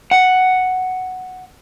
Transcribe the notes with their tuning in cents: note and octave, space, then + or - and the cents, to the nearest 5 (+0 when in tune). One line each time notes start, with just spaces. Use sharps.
F#5 +5